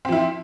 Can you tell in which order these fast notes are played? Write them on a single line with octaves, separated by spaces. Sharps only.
C4 F3 E4